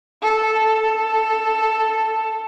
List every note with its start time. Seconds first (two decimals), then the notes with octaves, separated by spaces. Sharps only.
0.22 A4
0.64 A4